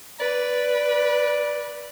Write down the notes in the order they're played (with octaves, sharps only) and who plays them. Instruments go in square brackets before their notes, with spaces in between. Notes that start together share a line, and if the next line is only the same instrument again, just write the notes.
[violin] B4 [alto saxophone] D5